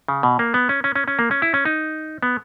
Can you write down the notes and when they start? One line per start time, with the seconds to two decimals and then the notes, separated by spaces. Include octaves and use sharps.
0.08 C#3
0.23 B2
0.39 A#3
0.54 B3
0.69 C#4
0.84 C#4
0.95 C#4
1.08 C#4
1.19 A#3
1.31 C#4
1.42 E4
1.54 C#4
1.65 D#4
2.23 B3